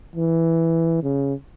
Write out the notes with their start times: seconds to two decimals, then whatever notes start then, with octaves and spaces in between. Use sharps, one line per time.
0.16 E3
1.03 C#3